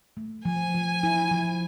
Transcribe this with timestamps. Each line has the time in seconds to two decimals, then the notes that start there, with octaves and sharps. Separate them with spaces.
0.17 A3
0.45 F3 G#5
0.75 F3
1.03 E4
1.31 F3